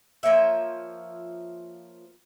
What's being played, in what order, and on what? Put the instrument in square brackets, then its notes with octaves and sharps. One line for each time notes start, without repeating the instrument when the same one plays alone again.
[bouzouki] F3 A#3 C#5 E5